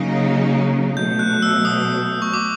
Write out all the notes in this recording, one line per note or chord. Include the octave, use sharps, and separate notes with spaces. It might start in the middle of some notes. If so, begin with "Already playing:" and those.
Already playing: C#3 F#3 A#3 D#4
B2 F#3 A3 G6
F#6
E6
D#6
C#6
D6